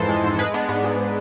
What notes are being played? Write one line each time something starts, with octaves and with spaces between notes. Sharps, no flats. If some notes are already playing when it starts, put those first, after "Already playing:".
Already playing: F2 G#2 E3 A4 C5
G#3
G#2
G#3 G#4 B4
G#3 B3 D4
G#2 B3
G#2